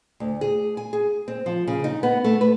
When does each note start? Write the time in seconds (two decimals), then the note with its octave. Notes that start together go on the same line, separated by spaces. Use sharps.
0.20 D2
0.41 G#4
0.77 G#5
0.93 G#4
1.28 C4
1.46 F3
1.67 C#3
1.84 D#4
2.03 B3
2.24 A3
2.41 B4